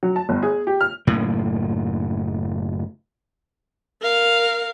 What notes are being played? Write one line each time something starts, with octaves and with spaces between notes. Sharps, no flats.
F#3
A5
G1
G#4
G4
F6
F#1 A2 A#3
A#4 F5